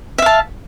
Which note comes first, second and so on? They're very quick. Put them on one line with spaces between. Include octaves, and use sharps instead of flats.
E5 F5 A5